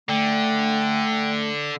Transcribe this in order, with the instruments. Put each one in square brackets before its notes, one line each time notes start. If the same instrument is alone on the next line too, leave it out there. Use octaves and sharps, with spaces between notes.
[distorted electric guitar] D3 [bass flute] A3 [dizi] G5